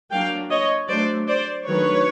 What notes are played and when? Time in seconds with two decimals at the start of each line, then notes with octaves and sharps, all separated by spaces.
0.11 F#3 A#3 D4 F5 G5
0.50 C#5 D#5
0.88 F#3 A3 D4 C5 D5
1.27 C5 D5
1.66 D#3 F#3 A3 D4 B4 C#5